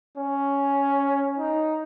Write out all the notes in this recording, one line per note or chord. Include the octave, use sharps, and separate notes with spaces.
C#4
D#4